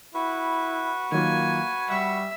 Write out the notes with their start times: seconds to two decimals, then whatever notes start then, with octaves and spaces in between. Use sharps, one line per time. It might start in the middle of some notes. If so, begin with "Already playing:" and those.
0.15 E4 F#4 B4
1.12 D#3 F#3 A#3 F4 G#5
1.90 G3 E5 F#5 C#6